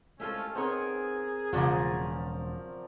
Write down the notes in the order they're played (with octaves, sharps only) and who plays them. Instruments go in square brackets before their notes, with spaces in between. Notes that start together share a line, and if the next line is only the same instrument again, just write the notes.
[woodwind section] C2 G#3 C#4 [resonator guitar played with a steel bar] A3 F4 A4
[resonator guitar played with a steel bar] B3 D#4 C#5 [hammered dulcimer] C4 A#4 [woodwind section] G#4
[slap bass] E1 [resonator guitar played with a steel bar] C#3 F#3 F#4 [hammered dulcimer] F3 D5 A#5